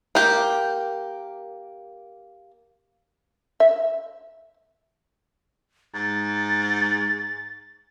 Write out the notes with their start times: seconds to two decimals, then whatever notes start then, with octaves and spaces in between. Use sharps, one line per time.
0.15 A#3 G4
3.60 E5
5.94 G#2 A6